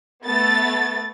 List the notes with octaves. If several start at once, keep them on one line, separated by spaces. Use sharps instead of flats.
A3 B3 A6